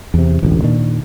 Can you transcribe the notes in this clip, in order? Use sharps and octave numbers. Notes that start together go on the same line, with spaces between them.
E2 C3
E1 A1 D2
A#2 D#3 D4